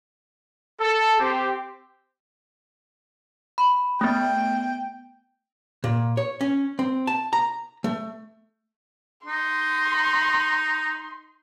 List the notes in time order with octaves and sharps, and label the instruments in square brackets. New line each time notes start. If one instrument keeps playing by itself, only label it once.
[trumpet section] A4
C4 G4
[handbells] B5
[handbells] A3 B3 [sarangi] G5
[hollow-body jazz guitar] A#2
C#5
C#4
C4
A5
A#5
A3
[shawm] D#4 [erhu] C6